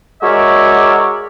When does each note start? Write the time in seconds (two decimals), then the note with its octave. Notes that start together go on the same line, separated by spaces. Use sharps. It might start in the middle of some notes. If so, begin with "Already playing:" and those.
0.22 G#3 F#4 A#4 C#5 D5 E5